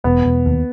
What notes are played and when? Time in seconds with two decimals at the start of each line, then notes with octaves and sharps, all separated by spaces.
0.04 E1 B3
0.25 E1
0.46 D#2